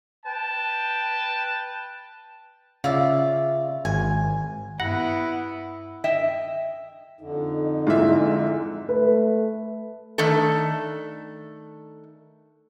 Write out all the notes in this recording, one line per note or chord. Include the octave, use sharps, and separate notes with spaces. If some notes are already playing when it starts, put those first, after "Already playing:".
B4 G5 A5
C#3 F4 D5 E5
G#1 G#5
G2 B3 E4 F#5 A#6
D#5 E5 G5
F2 D3 D#4
G#2 E3 F4 E5
A3 B4
D#3 A3 D4 A4